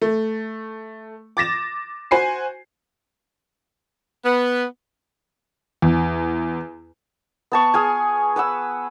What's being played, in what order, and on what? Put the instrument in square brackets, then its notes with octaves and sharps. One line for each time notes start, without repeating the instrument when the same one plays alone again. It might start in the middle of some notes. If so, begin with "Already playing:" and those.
[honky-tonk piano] A3
D6 A6 A#6 E7
F#4 C5 G#5 C7
[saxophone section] B3
[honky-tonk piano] E2
[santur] B3 A5 C#6
G#4 F5 G#5
B4 F#5 B5 E6